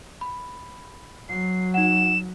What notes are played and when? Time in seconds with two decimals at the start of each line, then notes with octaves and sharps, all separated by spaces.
0.21 B5
1.29 F#3 C7
1.74 D#4 F#5 E7